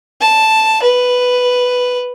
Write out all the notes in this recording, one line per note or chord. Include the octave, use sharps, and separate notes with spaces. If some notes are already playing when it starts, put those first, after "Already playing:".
A5
B4